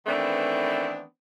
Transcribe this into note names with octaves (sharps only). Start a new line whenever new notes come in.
D#3 E3 A3 B3 C4 D4